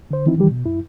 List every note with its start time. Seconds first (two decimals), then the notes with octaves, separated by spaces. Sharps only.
0.11 D3 C5
0.26 D#3 E3 C4 D#4 E4
0.38 D#3 E3 G3 G4
0.51 B2
0.65 F#2 E4